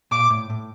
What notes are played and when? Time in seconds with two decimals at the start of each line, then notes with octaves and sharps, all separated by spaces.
0.11 A#2 D6
0.30 A2
0.50 A2